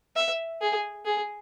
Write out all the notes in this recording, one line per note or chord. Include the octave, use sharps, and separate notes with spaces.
E5
G#4
G#4